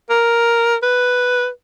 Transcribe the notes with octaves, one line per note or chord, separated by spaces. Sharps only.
A#4
B4